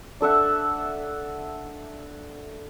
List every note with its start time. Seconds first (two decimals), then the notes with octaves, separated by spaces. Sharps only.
0.21 D4 A4 E5 F#5